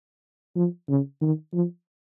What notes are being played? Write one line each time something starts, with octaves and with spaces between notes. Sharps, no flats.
F3
C#3
D#3
F3